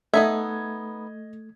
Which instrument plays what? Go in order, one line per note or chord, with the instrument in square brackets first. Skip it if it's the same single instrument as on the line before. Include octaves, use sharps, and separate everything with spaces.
[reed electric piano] A3 [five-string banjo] B3 D#4 E5 [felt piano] D#5 G#6